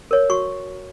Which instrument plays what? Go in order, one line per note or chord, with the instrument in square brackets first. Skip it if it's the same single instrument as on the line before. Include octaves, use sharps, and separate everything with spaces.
[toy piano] A#4 C#5
F#4 C#6